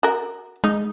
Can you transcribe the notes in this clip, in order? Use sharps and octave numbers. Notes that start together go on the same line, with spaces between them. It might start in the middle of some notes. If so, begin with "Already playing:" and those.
F#4 A#4
G#3 D#4